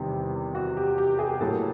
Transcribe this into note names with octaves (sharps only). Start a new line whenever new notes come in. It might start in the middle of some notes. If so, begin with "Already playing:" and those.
Already playing: E2 C3 D#3 G3
F#4
G4
G4
G#4
A2 F#3 A#3 A4